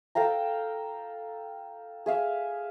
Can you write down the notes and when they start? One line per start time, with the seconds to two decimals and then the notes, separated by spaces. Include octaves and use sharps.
0.15 A4 F5 G5 A#5
2.06 G#4 E5 F5